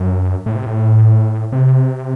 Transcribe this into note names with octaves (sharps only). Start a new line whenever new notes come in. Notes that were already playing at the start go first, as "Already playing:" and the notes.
Already playing: F#2
A2
C3
A2
C3